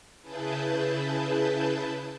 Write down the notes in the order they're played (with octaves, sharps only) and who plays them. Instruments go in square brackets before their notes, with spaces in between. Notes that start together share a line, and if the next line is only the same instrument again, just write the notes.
[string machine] C#3 E4 G#4 B4 A5 G6